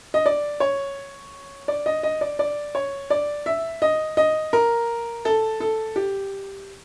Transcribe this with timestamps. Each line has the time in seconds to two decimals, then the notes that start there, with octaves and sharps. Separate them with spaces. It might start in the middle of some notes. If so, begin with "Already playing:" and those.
0.14 D#5
0.26 D5
0.60 C#5
1.68 D5
1.86 D#5
2.03 D#5
2.21 D5
2.39 D5
2.75 C#5
3.10 D5
3.46 E5
3.82 D#5
4.17 D#5
4.53 A#4
5.25 A4
5.60 A4
5.96 G4